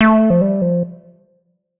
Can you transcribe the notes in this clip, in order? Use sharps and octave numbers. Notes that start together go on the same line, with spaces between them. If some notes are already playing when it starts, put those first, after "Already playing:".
A3
F3
G3
F3